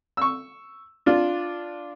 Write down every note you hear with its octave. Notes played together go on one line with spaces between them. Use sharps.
C#6 E6
D4 F4